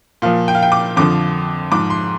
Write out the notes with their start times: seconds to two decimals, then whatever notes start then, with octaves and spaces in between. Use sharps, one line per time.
0.22 A#2 F3 F5
0.48 G5
0.55 F5
0.63 G5
0.72 D6
0.97 F2 D3 F3 D6
1.71 G#2 F3 D6
1.90 C6